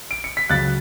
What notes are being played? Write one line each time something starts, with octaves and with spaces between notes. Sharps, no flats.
D7
C#7
B6
C#2 C#3 F#3 F#6 A6